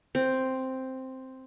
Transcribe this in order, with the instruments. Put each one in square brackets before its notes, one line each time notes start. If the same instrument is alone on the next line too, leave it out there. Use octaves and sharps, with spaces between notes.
[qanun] C4